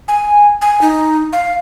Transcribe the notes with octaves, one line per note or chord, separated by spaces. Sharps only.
G#5
G#5
D#4
F5